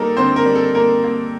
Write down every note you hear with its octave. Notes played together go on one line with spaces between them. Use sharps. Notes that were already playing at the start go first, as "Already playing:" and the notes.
Already playing: G3 A#3 D#4 A4 A#4
D3 C4 C5
A#4
G3
A4
A#3 A#4
A#3